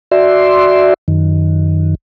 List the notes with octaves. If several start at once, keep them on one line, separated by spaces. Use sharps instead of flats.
F#4 D5 E5 C6
F#2 D#3